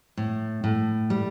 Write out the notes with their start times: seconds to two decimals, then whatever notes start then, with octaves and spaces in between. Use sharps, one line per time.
0.17 A2
0.64 A2
1.10 G3